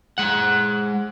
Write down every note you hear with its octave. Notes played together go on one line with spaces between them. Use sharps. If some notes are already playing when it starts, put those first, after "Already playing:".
G#3 F#5